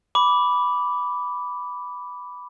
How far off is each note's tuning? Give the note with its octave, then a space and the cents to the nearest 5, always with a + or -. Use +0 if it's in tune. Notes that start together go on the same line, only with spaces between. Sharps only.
B5 +0 D6 -10